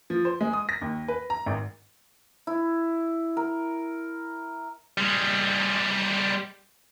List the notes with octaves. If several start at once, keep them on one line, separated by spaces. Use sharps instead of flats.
F3
C5
G#3
D#6
A#6
D#2
B4
A#5
G#1
E4
A#4
G3 G#3